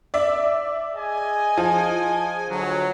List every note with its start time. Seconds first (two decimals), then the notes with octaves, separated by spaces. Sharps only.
0.14 D5 E5
0.96 G#4 D#5 G#5
1.57 F3
2.49 D2 D3 F#3